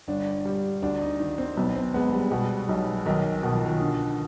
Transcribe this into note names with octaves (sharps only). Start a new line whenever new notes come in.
G1 D4
G3
D2 D4
D#4
D#3
C4
B1 B3
C4
G#3 B3
G3
B2 G3
B1
B1 D#3
B2 D#3
F3
D#3
D3